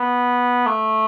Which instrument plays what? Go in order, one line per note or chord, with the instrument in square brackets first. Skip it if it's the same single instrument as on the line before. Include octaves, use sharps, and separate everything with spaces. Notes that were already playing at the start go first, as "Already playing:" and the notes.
Already playing: [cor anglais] B3
A3